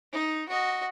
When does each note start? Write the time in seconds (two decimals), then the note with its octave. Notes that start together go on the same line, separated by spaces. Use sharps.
0.13 D#4
0.49 F#4 D#5